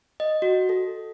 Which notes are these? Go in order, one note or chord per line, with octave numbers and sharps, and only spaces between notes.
D#5
F#4
A4